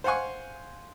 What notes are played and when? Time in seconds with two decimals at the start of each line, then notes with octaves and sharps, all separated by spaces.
0.04 C5 F5 F#5 G#5 C#6